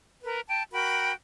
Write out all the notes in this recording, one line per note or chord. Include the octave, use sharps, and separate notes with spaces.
A#4 B4
G5 A5
F#4 A#4 G5 B5